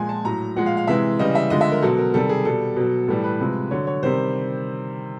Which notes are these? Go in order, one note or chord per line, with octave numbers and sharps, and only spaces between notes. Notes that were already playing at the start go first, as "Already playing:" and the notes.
Already playing: A#2 F3 G#3 G#5
A5
A2 F#3 A#5
A#2 F3 G#3 F#5
F5
F5
C3 E3 G#3 E5
C#3 E3 G3 D#5
E5
D3 F3 G#3 D#5
E5
A#4
B2 F#3 A4
A#4
C3 D#3 G3 A4
G#4
B2 G3 A4
B2 F#3
A2 E3 G3 A4
B4
C3 F3 G#3
D3 F#3 C#5
C#5
C3 D#3 G3 C5